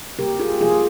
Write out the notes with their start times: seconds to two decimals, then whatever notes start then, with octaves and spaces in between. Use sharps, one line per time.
0.19 C3 G3 A#3 G4 A#4
0.40 F4 G#4
0.61 C3 F3 A#3 F4 G#4